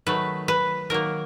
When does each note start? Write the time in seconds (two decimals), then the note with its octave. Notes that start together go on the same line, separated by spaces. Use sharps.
0.07 D#3 F#3 A3 B4
0.48 B4
0.90 D#3 F#3 A#3 A#4